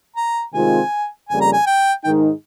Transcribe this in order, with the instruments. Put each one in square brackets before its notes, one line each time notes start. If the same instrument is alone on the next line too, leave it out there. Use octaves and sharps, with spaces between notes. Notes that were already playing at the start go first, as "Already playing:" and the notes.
[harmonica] A#5
[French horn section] C3 D#3 G#3 C4 F4 [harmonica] G#5
[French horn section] F2 C#3 G3 A#3 [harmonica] G#5
[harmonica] A#5
G#5
G5
[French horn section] G#2 D#3 G#3 D#4 [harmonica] G5